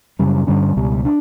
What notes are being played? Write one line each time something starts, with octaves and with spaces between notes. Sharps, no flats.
F#2 C#3 G3 C#4
G2 D3 G3 C#4
C#2 B2 G3
D4